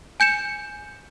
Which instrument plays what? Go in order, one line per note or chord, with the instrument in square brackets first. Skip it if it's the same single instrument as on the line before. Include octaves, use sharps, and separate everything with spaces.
[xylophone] G#5 G6 C#7 E7